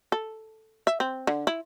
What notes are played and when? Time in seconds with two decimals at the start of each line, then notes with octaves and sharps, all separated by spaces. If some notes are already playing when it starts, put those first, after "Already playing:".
0.12 A4
0.87 E5
1.00 C4
1.27 D3
1.47 E4